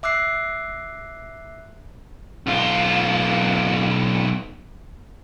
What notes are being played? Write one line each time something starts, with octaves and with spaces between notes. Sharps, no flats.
E5 D6 E6 F#6 C7
B1 F4